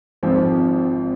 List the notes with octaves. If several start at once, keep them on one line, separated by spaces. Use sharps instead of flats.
G#1 G#2 F3 G#3 C4